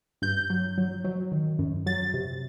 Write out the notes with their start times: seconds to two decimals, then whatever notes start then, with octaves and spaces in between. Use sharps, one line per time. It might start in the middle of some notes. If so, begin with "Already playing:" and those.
0.22 G2 G6
0.50 F#3
0.78 F#3
1.05 F#3
1.32 D#3
1.59 F#2
1.86 F#3 A6
2.14 C3